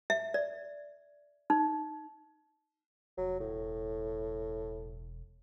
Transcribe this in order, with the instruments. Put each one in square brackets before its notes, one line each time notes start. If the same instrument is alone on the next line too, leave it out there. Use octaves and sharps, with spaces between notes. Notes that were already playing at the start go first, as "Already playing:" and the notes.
[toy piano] E5
D5
D#4
[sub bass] F1 [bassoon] F#3
[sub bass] E1 [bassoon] A2